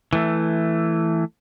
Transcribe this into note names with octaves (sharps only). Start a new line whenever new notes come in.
E3 A3